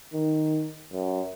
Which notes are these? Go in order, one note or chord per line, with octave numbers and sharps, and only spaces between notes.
D#3
F#2